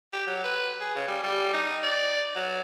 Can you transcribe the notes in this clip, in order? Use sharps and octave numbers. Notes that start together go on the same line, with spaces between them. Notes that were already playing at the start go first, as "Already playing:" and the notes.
G4
F#3
B4
G#4
C#3
G3
G3
D#4
D5
F#3